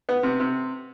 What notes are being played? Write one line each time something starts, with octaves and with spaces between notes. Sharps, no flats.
B3
C3
C3